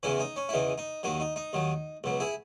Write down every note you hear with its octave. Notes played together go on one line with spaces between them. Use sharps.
E2 C#3 E3 C#4 E4
D#4
C#4
E4
E2 C#3 E3 D#4
D#4
D#2 D#3 F#3 D#4
D#4
D#4
D#2 D#3 F#3
C#2 B2 F#3
E4 G#4